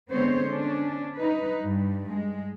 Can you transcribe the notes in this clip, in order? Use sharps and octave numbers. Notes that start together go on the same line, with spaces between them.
D3 G#3 B3 C4 C5 C#5
C#4 D4
D#4 B4
G2
G#3